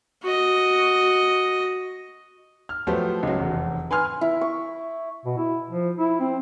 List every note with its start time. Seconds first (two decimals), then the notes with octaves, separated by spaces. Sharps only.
0.23 F#4 D#5
2.69 F6
2.87 F3 F#3 A3 B3 G4 C5
3.23 C#2 F#3
3.38 F1 E2
3.91 B4 G#5 C6 F6
4.21 E4
4.41 C#6
5.26 B2
5.37 E4
5.70 F3
5.97 E4
6.20 C4